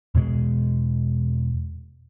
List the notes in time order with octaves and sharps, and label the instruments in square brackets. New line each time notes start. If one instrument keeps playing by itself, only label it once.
[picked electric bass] E2 B2 G#3